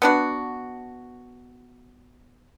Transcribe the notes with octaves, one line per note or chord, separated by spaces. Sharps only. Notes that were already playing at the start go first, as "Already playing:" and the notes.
B3 D4 F#4